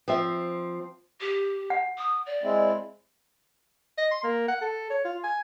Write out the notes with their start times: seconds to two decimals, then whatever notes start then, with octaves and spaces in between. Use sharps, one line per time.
0.08 F3 C4 E5
1.21 G4
1.70 F#5
1.98 D#6
2.26 D5
2.43 G#3 C4 E4
3.98 D#5
4.11 C6
4.23 A#3
4.48 F#5
4.61 A4
4.90 C#5
5.05 F4
5.24 G#5